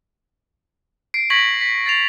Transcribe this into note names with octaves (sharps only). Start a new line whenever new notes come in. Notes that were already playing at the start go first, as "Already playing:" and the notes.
C7 D7
C#6 G#6 A#6 B6 D7 F#7
B6
A6 C7 F7